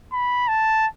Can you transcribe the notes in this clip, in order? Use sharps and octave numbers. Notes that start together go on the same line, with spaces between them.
B5
A5